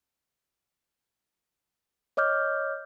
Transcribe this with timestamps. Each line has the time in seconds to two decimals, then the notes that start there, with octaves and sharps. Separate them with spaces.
2.17 C#5 D#5 D6 F6 G6